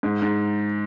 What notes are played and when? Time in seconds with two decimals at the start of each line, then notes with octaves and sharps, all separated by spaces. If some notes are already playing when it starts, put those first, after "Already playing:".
0.03 G#2
0.22 G#2